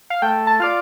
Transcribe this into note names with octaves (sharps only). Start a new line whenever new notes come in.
F5
A3 G5
A5
F4 D5 F5